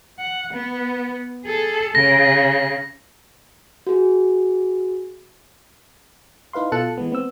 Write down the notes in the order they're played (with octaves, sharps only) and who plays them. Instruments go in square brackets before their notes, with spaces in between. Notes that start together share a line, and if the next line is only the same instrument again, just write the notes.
[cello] F#5
B3
G#4 A4
[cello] C#3 [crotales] A#6
[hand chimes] F#4 G#4
[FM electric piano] D#4 E4 B4 F5 C6
B2 F4 A4 A5 F#6 C#7
E3 G#3 B3
B3 C4 E6